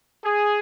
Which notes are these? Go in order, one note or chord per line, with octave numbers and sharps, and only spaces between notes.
G#4